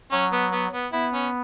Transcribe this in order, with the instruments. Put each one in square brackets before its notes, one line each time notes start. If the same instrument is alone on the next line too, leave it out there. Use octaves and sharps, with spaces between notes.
[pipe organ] F#3 [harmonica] C#4
[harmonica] B3
B3
B3
[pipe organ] B3 [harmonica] E4
[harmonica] C#4